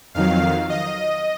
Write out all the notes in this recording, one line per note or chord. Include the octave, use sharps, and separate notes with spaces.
F2 D#3 F#3 F5
D#5